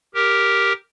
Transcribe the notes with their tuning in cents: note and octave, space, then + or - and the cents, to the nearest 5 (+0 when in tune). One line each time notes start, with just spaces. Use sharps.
G4 +0 A#4 +0